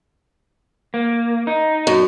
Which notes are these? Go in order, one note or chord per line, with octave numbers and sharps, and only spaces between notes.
A#3
D#4
F#2